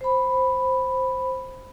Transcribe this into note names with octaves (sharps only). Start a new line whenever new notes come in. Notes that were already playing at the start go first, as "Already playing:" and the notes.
C5 B5